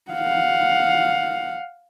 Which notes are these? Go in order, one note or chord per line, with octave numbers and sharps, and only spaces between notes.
F5 F#5